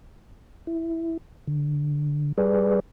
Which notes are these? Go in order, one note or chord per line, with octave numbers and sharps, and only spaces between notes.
E4
D3
G3 G#4 B4 D5